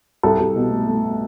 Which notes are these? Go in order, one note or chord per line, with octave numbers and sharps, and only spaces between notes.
C2 A4
C2
B2
A3
A3